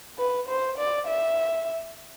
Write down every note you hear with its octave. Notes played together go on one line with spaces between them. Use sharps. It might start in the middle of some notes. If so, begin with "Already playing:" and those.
B4
C5
D5
E5